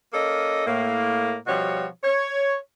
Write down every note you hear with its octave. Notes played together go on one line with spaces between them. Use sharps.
A#3 C#4 A4 D#5
A2 A#3
B2 F3 G3 F#4 C#5
C#5